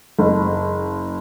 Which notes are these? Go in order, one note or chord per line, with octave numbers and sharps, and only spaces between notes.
F#1